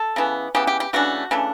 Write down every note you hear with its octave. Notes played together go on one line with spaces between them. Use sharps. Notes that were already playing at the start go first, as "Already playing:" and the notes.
Already playing: A4
C#3 E3 B3
C#3 E3 B3 G4
G4
G4
C#3 E3 A3 D4 F#4
C#3 E3 A3 D4